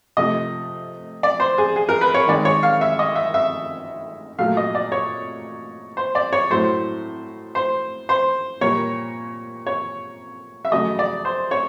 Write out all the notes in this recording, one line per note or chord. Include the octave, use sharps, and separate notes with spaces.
C3 F3 A3 D#5
D5
C5
G#4
G#4
A#4
B4
C#5
D#3 G#3 D5
C#5
F5
E5
D#5
E5
E5
A#2 F#3 A3 F5
D#5
D5
C#5
C5
D5
C#5
A2 F#3 A3 C5
C5
C5
A#2 G3 A#3 C#5
C#5
E5
C#3 F#3 A3 D#5
D5
C5
C#5